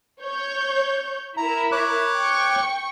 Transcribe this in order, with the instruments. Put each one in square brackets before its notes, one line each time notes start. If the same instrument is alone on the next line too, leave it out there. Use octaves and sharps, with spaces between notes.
[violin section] C#5 G6
[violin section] E4 A#4 [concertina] A#5
[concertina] C#5 D6 F#6
[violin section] G5 C#6 C#7